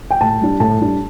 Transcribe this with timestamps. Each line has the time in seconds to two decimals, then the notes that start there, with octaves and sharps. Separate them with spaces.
0.11 G5
0.21 A2 A5
0.41 G3 D4
0.60 A2 A5
0.81 G3 D4